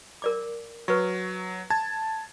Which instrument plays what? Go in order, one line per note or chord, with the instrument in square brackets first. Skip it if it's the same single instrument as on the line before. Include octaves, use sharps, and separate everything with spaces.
[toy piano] A#4 D5 D6
[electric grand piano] F#3 [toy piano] B4 C#6
[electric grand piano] A5 G#6